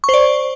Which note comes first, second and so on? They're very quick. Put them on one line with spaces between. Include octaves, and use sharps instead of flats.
C#6 C5 D5